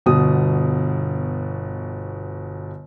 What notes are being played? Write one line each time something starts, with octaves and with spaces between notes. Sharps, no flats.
G1 B2 D#6